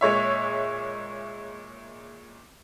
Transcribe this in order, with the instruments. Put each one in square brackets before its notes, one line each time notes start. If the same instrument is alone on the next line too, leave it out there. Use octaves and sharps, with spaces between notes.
[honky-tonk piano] A#2 G#3 C#5 E5